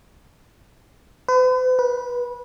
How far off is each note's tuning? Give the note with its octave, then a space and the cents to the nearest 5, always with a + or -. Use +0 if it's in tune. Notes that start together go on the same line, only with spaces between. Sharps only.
B4 +45
B4 -20